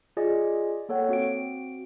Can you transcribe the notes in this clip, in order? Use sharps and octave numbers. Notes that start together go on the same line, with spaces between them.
F4 G#4 D5 D#5 G#5
A#3 A4 C#5 F#5 G5
C4 F#4 F5 D7